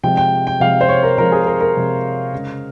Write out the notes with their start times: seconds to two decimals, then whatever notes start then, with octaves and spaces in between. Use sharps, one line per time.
0.03 C3 F3 G#3 G5
0.17 G5
0.47 G5
0.60 C3 F3 G#3 F5
0.81 C5
0.89 C#5
1.03 A#4
1.18 C3 F3 G#3 A#4
1.32 G#4
1.47 A#4
1.61 A#4
1.75 C3 F3 G#3
2.33 C#3 G#3